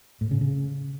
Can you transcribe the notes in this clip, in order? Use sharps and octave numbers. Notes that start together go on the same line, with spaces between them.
A2
C#3
C#3